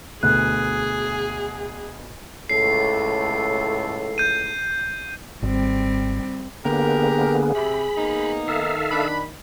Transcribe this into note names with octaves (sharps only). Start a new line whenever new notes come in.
D2 B2 G#4 F#6
C#2 A2 A4 C7
G6 D#7
G#1 G3 C4
D3 A#3 B3 G4 G#4 A#4
C3 B5
A#3 B3 D#4
D#3 A4 E5 F5
D4 B5